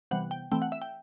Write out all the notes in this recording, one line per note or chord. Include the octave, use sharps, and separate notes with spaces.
C3 E3 G3 B3 F#5
G5
E3 A3 C4 G5
F#5
E5
G5